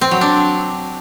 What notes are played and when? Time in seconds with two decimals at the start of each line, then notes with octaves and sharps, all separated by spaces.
0.01 C4
0.11 F#3
0.21 D4